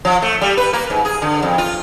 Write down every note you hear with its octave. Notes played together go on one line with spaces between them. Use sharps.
F3
A3
G3
B4
A#3
G#2
G#4
D3
F2
F4